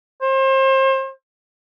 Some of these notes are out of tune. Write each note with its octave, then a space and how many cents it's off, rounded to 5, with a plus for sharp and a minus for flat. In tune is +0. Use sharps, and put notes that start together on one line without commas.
C5 +35